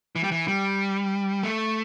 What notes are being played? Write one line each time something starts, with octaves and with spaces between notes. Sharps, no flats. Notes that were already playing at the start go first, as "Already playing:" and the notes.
E3
G3
E3
G3
A3